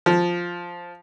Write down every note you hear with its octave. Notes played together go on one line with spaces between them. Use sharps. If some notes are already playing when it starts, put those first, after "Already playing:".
F3